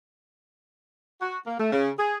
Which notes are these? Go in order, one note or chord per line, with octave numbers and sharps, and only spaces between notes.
F#4
A#3
A3
C#3
G#4